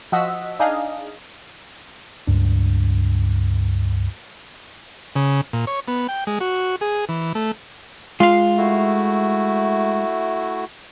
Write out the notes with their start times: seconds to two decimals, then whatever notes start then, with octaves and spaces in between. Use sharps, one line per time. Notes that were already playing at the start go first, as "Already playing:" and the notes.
0.12 F3 F#4 D#5 F#5 E6 B6
0.59 D4 D#4 G#4 D#5 F5
2.27 C#2 G2 D4
5.16 C#3
5.53 A#2
5.67 C#5
5.88 B3
6.09 G5
6.27 G#3
6.41 F#4
6.81 G#4
7.09 E3
7.35 A3
8.20 G#3 F4 F5
8.58 A3 E4 F#4